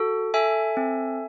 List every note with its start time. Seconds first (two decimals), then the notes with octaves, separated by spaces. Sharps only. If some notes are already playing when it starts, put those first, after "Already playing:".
Already playing: F#4 A4
0.34 A4 E5 G#5
0.77 C4